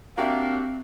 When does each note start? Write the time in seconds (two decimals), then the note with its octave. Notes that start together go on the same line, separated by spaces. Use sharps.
0.18 A#3 C4 D4 F#4 G4 E5 F5